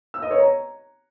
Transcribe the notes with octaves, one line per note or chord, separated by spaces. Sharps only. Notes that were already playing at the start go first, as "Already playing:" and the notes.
E6
D#5
C#5
A#5